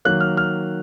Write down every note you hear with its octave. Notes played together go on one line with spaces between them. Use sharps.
D#3 F#3 A#3 F#6
F6
F6